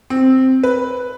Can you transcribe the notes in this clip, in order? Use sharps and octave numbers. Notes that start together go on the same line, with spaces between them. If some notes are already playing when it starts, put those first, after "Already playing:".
C4
B4